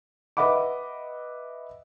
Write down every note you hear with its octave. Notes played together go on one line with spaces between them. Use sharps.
B4 D#5 E5 F#5 B5 D6